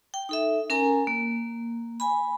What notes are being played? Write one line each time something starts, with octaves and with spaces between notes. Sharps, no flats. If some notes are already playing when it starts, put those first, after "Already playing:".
G5
D#4 A4 E5
C#4 A#4 G#5 A#5
A#3
G#5 B5